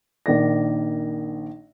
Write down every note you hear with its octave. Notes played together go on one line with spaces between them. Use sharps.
A#1 D#3 D5 A#6